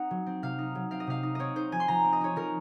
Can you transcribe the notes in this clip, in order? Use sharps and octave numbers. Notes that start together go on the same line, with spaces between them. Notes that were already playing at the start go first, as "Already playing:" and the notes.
Already playing: C4 D#4 F#5
F#3
C4
C3 F5
D#4
F#3
C4 F5
D#5
C3 F5
D#4
C4 C#5 D#5
D#4 C5
F3 G#5
C6
F3 A#5
C4
D#5
D#4 C#5
F3 A#4